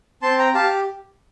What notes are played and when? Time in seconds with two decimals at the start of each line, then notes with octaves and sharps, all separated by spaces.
0.22 C4 A5 C6
0.39 G5 A#5
0.54 G4 F5 A5